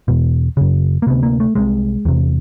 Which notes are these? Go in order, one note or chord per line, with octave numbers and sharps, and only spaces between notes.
E2 B2
F#2 C#3
A#3
D2 C3 B3
A#3
A3
C2 C3 G#3
E2 C3